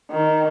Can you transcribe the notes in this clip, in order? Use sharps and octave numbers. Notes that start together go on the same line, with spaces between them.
D#3